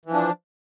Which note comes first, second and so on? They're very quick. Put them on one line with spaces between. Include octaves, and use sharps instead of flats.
E3 F3 D4